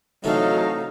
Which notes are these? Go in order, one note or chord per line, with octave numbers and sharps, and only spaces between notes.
C3 E3 F#3 A3 D#4 A4 F5